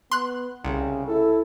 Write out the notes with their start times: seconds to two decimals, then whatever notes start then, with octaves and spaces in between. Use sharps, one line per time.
0.11 B3 C6 F#6
0.64 C2 C#3
1.08 E4 A4